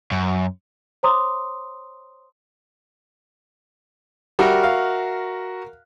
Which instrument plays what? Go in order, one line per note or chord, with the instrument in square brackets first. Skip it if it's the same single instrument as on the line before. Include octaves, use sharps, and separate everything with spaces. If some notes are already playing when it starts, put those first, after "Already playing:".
[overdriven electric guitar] F#2
[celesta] C5 C#5 A#5 C6 D6 D#6
[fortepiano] G3 [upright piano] F#4 A#4 E5
[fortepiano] F5